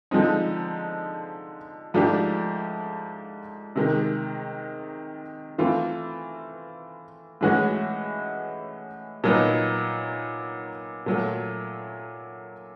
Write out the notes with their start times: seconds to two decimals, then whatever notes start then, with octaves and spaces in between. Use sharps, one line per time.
0.11 D3 F3 G#3 C4 D#4
1.94 G#2 F3 A3 D4 G4
3.76 C3 D#3 G#3
5.58 E3 A3 C4 F4
7.41 A2 E3 G#3 C#4 F#4
9.24 A#2 F#3 B3 D#4
11.06 A#2 F#3 A3